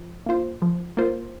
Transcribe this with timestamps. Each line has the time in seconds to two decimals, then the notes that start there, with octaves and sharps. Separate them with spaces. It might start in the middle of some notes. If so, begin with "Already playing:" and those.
Already playing: F3
0.26 A#3 F4 C5
0.62 F3
0.97 A#3 F4 C5